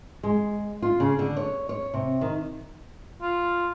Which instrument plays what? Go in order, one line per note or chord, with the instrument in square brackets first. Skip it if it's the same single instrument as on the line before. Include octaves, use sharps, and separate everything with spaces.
[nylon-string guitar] G#3
F4
C#3
D3
C#5
C#5
C3
D#3
[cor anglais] F4